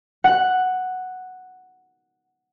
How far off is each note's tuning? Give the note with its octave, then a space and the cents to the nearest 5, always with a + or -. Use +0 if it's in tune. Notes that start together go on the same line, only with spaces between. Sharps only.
F#5 +0